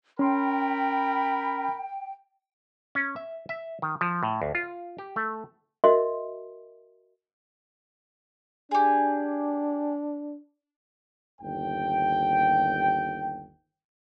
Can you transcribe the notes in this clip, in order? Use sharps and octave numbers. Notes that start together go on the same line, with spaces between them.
C#4 A#4 G5 B5 C6
C#4
E5
E5
D#3
F3
A2
D2
F4
G4
A3
F#4 A#4 D#5 E5 C6
D4 G4 G#4
G1 D#2 G5